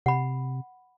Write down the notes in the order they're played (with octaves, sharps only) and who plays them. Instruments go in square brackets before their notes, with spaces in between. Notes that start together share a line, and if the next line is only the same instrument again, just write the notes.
[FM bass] C3 [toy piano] F#5 B5